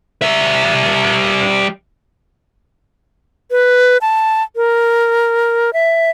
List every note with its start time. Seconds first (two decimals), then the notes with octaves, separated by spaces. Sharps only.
0.22 G3 E5
3.51 B4
4.02 A5
4.56 A#4
5.73 E5